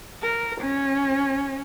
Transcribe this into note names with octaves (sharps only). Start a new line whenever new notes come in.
A#4
C#4